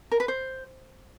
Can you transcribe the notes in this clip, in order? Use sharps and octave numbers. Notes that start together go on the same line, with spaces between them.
A#4
B4
C5